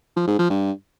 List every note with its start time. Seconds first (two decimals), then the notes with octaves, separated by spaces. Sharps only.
0.16 F3
0.27 G#2
0.39 F3
0.50 G2